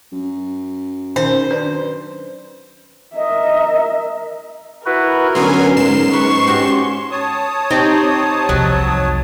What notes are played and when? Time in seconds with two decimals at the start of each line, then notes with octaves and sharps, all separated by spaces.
0.12 F#2
1.16 D#3 C#4 D#4 C5
1.51 D4 B4 D5
3.15 A#4 D#5 E5
4.86 E4 F#4 A#4 B4
5.35 D3 F#3 B3 C#4 G#5 C6
5.77 G#2 C7 E7
6.13 B4 C#6
6.47 C#4 F#4 G4
7.11 C#5 A5 D#6
7.71 C4 D#4 G4
8.49 C2 F2 F#3